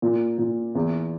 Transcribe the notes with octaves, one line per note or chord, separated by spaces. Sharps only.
A#2
A#2
E2